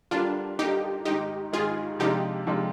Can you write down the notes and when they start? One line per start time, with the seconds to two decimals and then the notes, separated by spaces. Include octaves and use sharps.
0.11 D3 G3 A#3 D4 F4
0.59 D3 G3 A#3 D#4 G4
1.05 G#2 D#3 G#3 D#4 G4
1.53 G#2 D#3 G#3 F4 G#4
1.99 C3 F3 G#3 D4 D#4 F4 G4
2.47 C3 F3 G#3 D4 F4